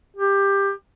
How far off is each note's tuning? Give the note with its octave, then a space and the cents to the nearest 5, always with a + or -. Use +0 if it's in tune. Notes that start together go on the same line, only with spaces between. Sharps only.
G4 +15